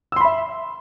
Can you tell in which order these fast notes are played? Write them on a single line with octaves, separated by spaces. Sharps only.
E6 C6 B5 E5